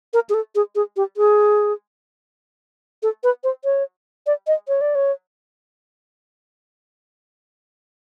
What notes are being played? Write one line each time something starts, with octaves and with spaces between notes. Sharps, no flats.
A#4
G#4
A4
G#4
G#4
G4
G#4
A4
B4
C5
C#5
D5
D#5
C#5
D5
C#5